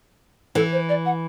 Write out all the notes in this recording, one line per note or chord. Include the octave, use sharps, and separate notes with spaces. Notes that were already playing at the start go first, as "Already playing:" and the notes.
E3 A4
C5
D5
F#5